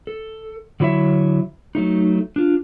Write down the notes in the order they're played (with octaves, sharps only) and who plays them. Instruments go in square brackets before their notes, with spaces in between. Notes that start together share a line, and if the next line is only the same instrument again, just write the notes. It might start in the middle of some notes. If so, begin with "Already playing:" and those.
[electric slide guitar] A4
D3 F#3 E4 C#5 E5
F#3 A3 D#4
D4 F4